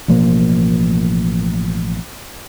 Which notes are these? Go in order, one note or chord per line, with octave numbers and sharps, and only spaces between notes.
A1 B2 F3 A#3